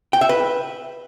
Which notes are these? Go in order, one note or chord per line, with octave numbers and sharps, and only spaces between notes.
G5
E5
B4